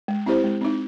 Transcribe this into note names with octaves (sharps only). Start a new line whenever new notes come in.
G#3
C4 E4 G4 C5
G#3
C4 D#4